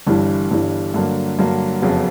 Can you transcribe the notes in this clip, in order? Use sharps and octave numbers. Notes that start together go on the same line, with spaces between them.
G1 G2 E3 G3
G1 G2 E3 G3
G2 D3 F#3 A#3
G2 D3 F#3 A#3
F#1 F2 C#3 F#3 B3